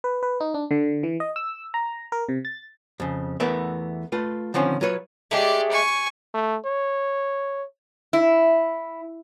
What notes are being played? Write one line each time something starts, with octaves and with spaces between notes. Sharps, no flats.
B4
B4
D#4
D4
D3
E3
D#5
E6
A#5
A#4
C3
A6
F2 C#3
E2 E3 A3 B3 A#4 E5
A3 F4 B4
D3 D#3 F3 C4 C#4
F#3 F4 B4 C#5
G#3 A3 G4 D5
G#5 C#6
A3
C#5
E4